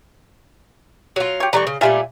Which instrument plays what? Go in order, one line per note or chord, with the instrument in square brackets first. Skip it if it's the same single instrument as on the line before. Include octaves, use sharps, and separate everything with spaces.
[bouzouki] F#3 F4
[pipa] G4 C#5
[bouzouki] E3 G3 A3 [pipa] A#5 C#6
[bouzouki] C#3
[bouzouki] A#2 G3 A3 [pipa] F4 E5 G#5